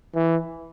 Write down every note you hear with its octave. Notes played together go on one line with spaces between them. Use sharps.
E3